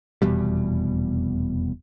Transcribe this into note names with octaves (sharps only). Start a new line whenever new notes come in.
F1 E2 B2 G3